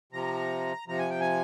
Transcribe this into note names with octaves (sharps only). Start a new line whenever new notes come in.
C3 F3 A#5
C3 F3 A#5
G#5
G5
G#5